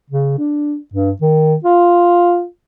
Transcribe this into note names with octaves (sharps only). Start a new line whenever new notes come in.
C#3
D4
G2
D#3
F4